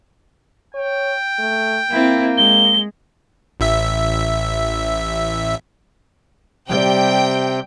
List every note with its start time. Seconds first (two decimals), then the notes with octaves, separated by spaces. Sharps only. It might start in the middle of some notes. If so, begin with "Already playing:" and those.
0.74 C#5 G5
1.39 A3
1.91 A#3 C4 E4
2.38 G#3 G7
3.60 A1 E5
6.69 C3 G3 G5